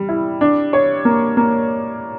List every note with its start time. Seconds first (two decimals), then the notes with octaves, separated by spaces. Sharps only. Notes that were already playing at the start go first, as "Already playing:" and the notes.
Already playing: G3
0.09 E4
0.41 D4
0.73 C#5
1.05 A#3
1.37 A#3